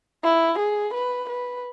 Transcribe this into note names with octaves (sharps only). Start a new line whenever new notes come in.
E4
G#4
B4
B4